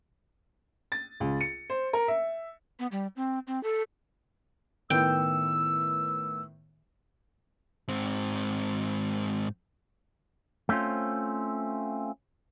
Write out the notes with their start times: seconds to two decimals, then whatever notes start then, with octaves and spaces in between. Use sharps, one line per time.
0.92 A6
1.20 C#2
1.41 C#7
1.70 C5
1.93 A#4
2.08 E5
2.79 B3
2.92 G3
3.16 C4
3.47 C4
3.63 A4
4.90 A2 D#3 B3 G5 E6
7.88 G#2 C4
10.69 A3 C4 C#4 F4 C5